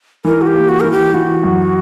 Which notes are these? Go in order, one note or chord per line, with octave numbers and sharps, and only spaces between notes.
E3 A#4
F#4
G4
A#3
F#4
E3 A#4
G4
E3 F#4
F#2